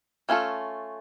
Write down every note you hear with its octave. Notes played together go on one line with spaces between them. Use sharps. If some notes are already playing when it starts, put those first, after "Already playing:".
A3 C#4 F4 A4